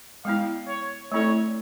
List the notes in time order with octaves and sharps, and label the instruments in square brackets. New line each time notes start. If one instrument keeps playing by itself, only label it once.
[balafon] G#3 B3 E4 [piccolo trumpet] F5
[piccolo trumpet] C#5
[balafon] A3 C4 E4 A4 D5 [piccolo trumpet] C#5